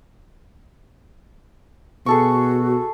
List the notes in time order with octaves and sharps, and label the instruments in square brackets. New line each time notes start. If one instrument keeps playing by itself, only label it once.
[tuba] B2 [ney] F#4 [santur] G#4 A4 C#6